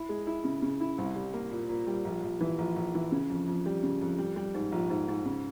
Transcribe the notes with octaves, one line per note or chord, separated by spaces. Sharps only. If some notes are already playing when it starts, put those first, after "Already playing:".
Already playing: E4
G#3
E4
C#3
C#3
E4
C2
G3
A#3
A#2
A#2
G3
A#1
A#1
E3
A#1
A#1
E3
C#3
F2
F2
G3
C#3
F2
G3
G3
G#2
A#1
G#2
G#2
C#3